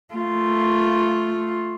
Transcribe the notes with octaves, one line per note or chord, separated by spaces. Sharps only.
A3 F4